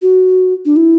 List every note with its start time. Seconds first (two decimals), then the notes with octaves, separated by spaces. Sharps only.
0.02 F#4
0.65 D4
0.76 E4